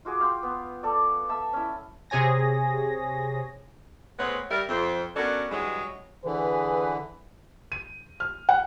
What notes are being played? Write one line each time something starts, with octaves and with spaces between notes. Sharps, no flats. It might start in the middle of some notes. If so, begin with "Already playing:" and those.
F4 F#4 G#4 D6
F5 G5 C6
B3
A4 D5
E5 A5 E6
C#4 E4
C3 G#4 C#5 G#5 A#6
A2 G#3 B3 C4 B4 C#5
G3 A#4 E5
F2 C4
B3 C#4 D4 F#4 A4 A#4
G2 E3 F#3 G#3
D3 E3 G#4 B4
D#7
F6
F#5